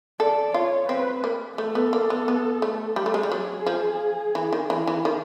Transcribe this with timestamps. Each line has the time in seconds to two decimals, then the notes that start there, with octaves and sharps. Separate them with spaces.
0.20 A4 D5
0.54 F4 C#5
0.89 C4 B4
1.24 A#3
1.58 A3 A4
1.75 B3
1.93 A#3
2.10 B3
2.28 B3
2.62 A3
2.96 G3 G#4
3.06 A3
3.14 G#3
3.23 G3
3.32 F#3
3.66 F3
4.35 E3
4.53 D#3
4.70 E3
4.87 E3
5.05 D#3